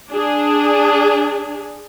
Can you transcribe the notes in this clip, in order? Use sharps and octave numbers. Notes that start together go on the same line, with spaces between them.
D4 G#4